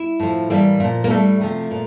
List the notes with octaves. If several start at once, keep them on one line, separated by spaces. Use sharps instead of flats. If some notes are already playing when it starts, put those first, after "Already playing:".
Already playing: E4
A2 F3
A2 E3 G3 A#3
A#2 F3
A#3
A2 G3 A3
C3 F3
A#2